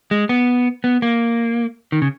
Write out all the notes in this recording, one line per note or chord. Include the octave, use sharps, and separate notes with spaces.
G#3
B3
B3
A#3
D#3
C#3